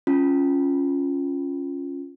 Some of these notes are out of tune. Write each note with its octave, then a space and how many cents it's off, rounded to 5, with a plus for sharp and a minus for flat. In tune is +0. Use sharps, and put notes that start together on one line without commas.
C#4 +0 F4 +0